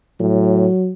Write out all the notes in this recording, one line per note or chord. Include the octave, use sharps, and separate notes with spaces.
A2 F#3